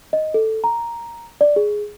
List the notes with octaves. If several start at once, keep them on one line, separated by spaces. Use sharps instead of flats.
D#5
A4
A#5
D5
G#4